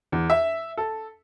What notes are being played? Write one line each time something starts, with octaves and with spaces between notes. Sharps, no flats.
E2
E5
A4